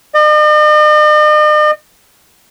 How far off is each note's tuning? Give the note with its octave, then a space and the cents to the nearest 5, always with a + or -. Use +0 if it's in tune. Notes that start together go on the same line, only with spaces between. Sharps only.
D#5 -45